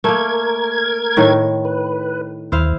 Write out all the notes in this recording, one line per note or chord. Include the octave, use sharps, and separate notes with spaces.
A3 A#3 A#4 G#6
A2 D#3 G5
B4
D#2 E4 C5 F5